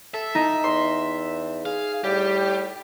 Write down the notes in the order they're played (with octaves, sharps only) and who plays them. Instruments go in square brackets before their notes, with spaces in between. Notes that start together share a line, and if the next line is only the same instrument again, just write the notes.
[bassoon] A4 [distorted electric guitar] E5
[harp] D#4
[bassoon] E2 [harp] C6
[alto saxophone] G#4 [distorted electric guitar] F5
[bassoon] A2 [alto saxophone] G3 [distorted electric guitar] G4